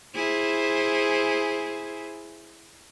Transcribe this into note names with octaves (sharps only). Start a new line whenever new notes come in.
E4 G#4 C5